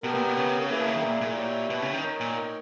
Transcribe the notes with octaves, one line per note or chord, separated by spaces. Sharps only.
B2 B3 G4 A#4
A#2
B2
C#3
E3 A#3 E4 G#4
B2
C#3
D#3
A#2
A#2
E4 G4 C#5 G5
B2
C#3
D#3
D#4 A#4 C#5 G5
A#2